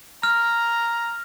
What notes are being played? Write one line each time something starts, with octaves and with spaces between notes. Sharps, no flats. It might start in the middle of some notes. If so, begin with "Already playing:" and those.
A#5 F6